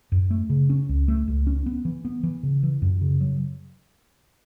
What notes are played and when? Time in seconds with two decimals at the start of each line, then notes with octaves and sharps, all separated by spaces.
0.12 F#2
0.30 A3
0.50 C#3
0.70 C#4
0.89 C#2
1.08 A3
1.28 C#2
1.47 C#4
1.66 B3
1.85 E3
2.05 B3
2.23 E3
2.43 C#3
2.63 E3
2.82 F#2
3.01 C#3
3.21 F#3